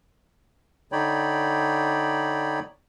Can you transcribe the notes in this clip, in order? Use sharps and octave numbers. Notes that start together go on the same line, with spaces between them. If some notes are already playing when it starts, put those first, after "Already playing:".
D3 D#4 C#5 D5 G5 B5